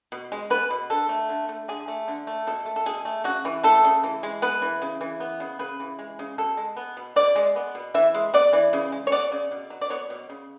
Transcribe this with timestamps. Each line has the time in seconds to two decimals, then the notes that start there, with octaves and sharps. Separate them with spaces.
0.12 B2
0.32 G#3
0.50 B3 B4
0.70 B2
0.90 D3 A4
1.09 A3
1.29 D3
1.49 A3
1.68 D3 G#4
1.88 A3
2.08 D3
2.27 A3
2.47 B2 A4
2.66 A3
2.76 A4
2.86 B2 G#4
3.05 A3
3.24 C#3 F#4
3.45 E3
3.63 A3 A4
3.84 C#3
4.03 E3
4.23 G#3
4.42 B3 B4
4.62 E3
4.82 C#3
5.01 E3
5.20 B3
5.40 C#3
5.59 C#3 B4
5.80 E3
5.99 G#3
6.19 C#3
6.38 B2 A4
6.57 G#3
6.77 B3
6.97 B2
7.16 B2 D5
7.36 G#3
7.56 B3
7.75 B2
7.94 E3 E5
8.14 G#3
8.34 B3 D5
8.53 E3
8.73 C#3
8.92 G#3
9.07 C#5
9.12 B3 D5
9.32 C#3
9.51 B2
9.70 F#3
9.81 D5
9.90 B3 C#5
10.10 B2
10.30 C#3